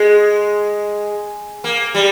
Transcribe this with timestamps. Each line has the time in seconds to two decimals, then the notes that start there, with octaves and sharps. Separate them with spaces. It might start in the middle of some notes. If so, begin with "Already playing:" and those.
Already playing: G#3
1.64 A#3
1.94 G3